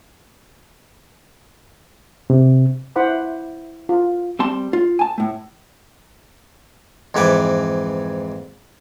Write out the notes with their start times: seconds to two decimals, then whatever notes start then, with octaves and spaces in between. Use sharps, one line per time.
2.30 C3
2.96 E4 C5 F#5 B5 D6
3.89 F4
4.39 G3 C4 A5 C6
4.73 F4
4.99 G#5 A5
5.18 A2 A3
7.14 F2 G#2 E3 B4 G#5 D6